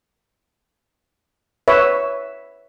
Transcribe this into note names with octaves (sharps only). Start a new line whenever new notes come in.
B4 C#5 E5